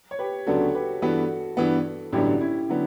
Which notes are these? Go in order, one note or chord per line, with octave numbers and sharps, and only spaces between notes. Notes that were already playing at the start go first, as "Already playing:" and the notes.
C#5
G4 B4
D2 C#3 F#3 B3 D4 F#4 A4
G4 B4
G2 E3 B3 F#4 A4
G2 E3 B3
A1 G2 D3 F#3 B3 E4 G4
C#4 E4
D3 F#3 B3